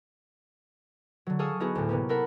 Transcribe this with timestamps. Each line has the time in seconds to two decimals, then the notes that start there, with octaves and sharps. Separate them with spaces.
1.27 D3 F#3
1.39 G#4 A4 F5 C#6 D#6 E6
1.60 B3 D#4 E4 F#4 G#4
1.75 D2 A2
1.89 C3 A#3 B3 C#4
2.09 E4 A4 A#4 F#5 B5